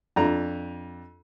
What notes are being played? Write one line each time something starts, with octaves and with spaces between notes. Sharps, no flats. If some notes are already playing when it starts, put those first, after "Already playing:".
F2 D4 A#5